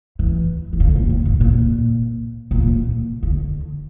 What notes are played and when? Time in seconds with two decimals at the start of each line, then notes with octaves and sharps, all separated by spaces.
0.19 E3
0.73 E3
0.80 D3
0.96 A#2
1.10 A2
1.25 G2
1.41 A#2
2.51 A#2
2.62 C3
3.23 D3